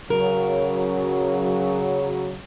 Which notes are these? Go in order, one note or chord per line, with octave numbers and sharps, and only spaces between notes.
C#3 F#3 A#4